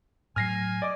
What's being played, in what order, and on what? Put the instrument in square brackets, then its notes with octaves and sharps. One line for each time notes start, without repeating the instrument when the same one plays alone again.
[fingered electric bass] A2 F#3 [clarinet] G#5 [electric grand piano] F6 A#6 C7
[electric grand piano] D5 D#5 D6